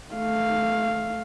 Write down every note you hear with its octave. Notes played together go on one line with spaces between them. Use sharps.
A3 F5